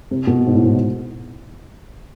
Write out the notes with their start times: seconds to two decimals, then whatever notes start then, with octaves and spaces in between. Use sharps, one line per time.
0.11 C3
0.27 B2
0.46 G#2
0.53 A2
0.64 G#2